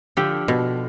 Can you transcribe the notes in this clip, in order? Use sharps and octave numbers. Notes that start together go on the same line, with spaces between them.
D3 F3 G4
B2